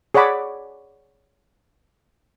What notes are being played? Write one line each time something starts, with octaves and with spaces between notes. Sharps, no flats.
G#4 C#5 D5 F#5 B5 D6